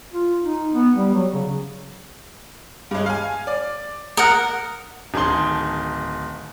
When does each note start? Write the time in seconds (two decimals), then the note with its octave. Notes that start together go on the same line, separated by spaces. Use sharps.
0.14 F4
0.44 D#4
0.74 B3
0.95 G3
1.14 F#3
1.34 C#3
2.91 G2 G#3
3.06 F5 G#5
3.47 D5
4.17 A#4 F#5 D#6
5.14 D1 D#3 G#4 A5 C6 G7